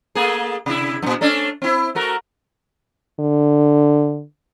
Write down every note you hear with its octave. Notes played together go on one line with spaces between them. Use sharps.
A3 A#3 G#4
C3 E4
F#2 A#2
A3 C#4 D4
C4 E4
A3 F#4 A#4
D3